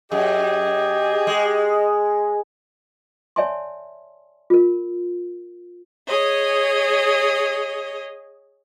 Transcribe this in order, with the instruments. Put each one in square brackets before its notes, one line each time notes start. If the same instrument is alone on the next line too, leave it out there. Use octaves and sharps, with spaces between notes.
[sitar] F#2 [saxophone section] G4 G#4 [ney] D#5
[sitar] G#3
[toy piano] C#5 D5 E5 G#5 A5 C6
F4 A#4
[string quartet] G#4 C#5 D#5